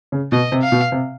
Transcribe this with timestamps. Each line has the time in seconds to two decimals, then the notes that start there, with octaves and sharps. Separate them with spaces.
0.12 C#3
0.32 B2 D#5
0.52 C3
0.62 F5
0.72 B2
0.92 C3